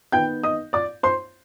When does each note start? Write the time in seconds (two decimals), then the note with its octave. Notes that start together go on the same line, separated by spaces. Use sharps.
0.12 D#3 B3 G5 G6
0.43 D#5 D#6
0.73 D5 D6
1.03 C5 C6